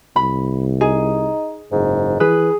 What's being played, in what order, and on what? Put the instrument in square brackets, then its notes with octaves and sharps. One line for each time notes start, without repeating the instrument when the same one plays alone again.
[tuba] C2 [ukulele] B5
[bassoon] D#4 [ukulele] G#4
[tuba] F#1 [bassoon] G#2
[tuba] E3 [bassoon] G#4 [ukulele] B4